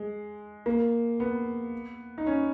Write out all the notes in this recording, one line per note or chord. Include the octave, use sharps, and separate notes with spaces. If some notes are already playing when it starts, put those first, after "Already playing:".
Already playing: G#3
A#3
B3
D#4
C#4